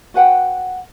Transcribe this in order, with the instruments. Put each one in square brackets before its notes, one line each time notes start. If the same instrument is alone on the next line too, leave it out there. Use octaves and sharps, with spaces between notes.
[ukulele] F#4 B4 F#5 G5